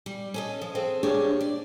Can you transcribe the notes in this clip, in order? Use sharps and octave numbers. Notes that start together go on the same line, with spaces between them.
G3
C#4 A4 D#5
F3
C4 G#4 A4
A#3 D4 G4 G#4 C#5
D5